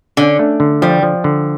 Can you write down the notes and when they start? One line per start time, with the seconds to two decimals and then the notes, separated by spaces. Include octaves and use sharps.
0.17 D3 C#4
0.39 A3
0.60 D3
0.82 F3 G3
1.03 F3
1.24 D3